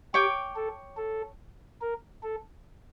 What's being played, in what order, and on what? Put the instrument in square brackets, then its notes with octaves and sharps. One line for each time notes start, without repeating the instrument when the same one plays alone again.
[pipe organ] G4 [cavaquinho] C#5 G5 D6
[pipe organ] A4
A4
A#4
A4